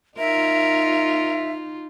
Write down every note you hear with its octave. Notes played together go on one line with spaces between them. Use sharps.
D#4 F4 A#4 E5